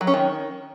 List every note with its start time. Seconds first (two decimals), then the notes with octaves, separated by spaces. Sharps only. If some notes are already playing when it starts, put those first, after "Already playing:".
0.01 F#3
0.07 C#4
0.14 D#3